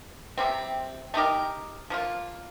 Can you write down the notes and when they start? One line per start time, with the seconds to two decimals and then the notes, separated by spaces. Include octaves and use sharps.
0.38 C3 G3 C4
1.14 A3 D#4 G4 A#4
1.90 F3 A#3 F4